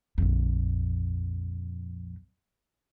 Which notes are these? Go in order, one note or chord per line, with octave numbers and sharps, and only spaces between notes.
A#1 F2